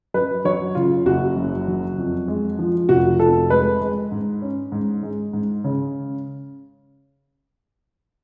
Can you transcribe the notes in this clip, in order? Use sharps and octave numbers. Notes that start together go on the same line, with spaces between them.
F#2 B4
F#3 C#5
C#3 F4
F#1 F#4
F#2
F#3
F2
G#3
F3
F1 F#4
F2 A4
G#3 B4
G#3
G#2
C#4
G#2
G#3
G#2
C#3